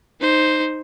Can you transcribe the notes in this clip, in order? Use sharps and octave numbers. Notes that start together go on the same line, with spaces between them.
D#4 C5